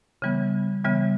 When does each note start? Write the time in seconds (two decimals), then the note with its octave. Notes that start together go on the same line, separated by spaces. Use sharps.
0.22 C#3 E3 G3 B3
0.84 C#3 E3 G3 B3